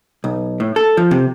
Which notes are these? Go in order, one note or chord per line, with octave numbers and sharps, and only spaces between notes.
B1
A2
A4
F3
C3